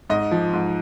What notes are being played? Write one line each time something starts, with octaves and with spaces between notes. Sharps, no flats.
G#2 D#5
F3
G#2